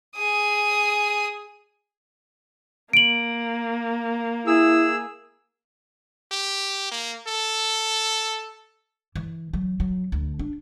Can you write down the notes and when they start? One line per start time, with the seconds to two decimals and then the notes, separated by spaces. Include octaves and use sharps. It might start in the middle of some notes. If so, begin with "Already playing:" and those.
0.16 G#4 D#6
2.93 A#3 D7 F#7
4.47 E4 G#4 E6
6.31 G4
6.91 A#3
7.27 A4
9.15 E3
9.53 F#3
9.80 F#3
10.12 D2
10.39 D4